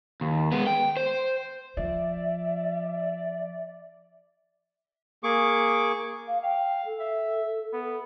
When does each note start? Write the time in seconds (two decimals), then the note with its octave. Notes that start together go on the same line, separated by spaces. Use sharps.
0.21 D#2
0.52 G#3 B3
0.67 G5
0.97 C5
1.77 F3 D5 E5
5.24 A#3 G#4 C#6 D6
6.28 F5
6.43 F5 G5
6.86 A4
7.00 E5
7.73 B3